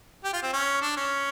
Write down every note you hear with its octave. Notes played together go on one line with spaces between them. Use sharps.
G4
F4
C4
C#4
D4
C#4